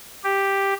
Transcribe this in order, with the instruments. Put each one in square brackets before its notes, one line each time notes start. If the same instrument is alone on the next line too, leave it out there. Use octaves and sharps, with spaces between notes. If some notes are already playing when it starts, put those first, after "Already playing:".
[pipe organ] G4